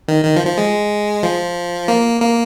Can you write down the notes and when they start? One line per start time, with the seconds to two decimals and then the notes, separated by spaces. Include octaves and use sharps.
0.08 D#3
0.25 D#3
0.36 F3
0.46 F3
0.58 G#3
1.23 F3
1.88 A#3
2.22 A#3